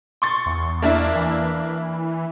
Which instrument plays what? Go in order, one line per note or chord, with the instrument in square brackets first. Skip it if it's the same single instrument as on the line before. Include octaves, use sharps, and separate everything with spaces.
[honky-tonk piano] C6 C#6 A6
[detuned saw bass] E2
[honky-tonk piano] A#3 D4 E4
[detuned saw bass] E3